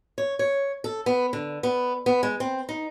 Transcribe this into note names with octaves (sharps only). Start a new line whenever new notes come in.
C#5
C#5
A4
B3
D3
B3
B3
G#3
C4
D#4